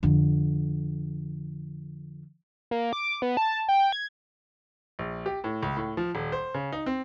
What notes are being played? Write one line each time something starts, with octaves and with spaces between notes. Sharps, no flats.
F2 D3
A#3
D6
B3
A5
G5
G#6
A#1
G4
A2
C#2
A2
F3
D#1
C5
C#3
D#4
C4